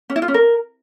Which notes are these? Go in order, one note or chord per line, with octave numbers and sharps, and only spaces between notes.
C#4
E4
F4
C#4
A#4